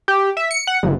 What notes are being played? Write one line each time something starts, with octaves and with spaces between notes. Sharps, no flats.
G4
E5
C#7
F#5
G1